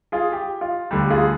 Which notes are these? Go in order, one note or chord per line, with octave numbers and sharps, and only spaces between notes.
F4 G#4
G4
F4
D2 D3 G3 G4
F4 G#4